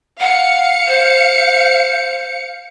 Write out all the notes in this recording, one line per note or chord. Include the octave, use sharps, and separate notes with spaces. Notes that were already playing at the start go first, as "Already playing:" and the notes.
F5 F#5 C#7
C5